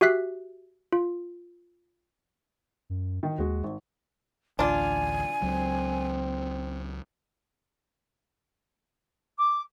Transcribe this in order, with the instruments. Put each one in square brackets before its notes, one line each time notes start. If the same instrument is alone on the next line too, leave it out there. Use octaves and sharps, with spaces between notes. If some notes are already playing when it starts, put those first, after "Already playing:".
[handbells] F#4 G4 E5 F#6 B6 C7
F4
[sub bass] F#2
[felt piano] D#3
[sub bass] D#2 [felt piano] G#3 F#4
[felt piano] G#1
[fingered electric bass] A1 D2 [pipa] D4 F4 [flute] G#5
[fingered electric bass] C#2 F#3 [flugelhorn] C4
[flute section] D6